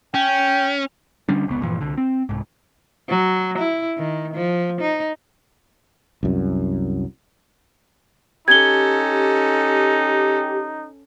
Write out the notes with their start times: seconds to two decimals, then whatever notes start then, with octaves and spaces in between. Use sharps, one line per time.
0.14 C#4 G5
1.29 D3 G3 C#4 D4
1.47 F1 C#2 B3
1.63 G2 A#2 E3 F3
1.81 C2 D3
1.98 C4
2.29 C2 G#2
3.09 F#3
3.58 E4
3.98 D#3
4.34 F3
4.81 D#4
6.23 C2 F#2
8.48 C#4 D#4 G4 A4 G#6 G7